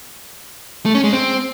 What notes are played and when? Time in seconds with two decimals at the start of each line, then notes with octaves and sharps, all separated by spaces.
0.86 A3
0.95 C#4
1.04 G#3
1.13 C4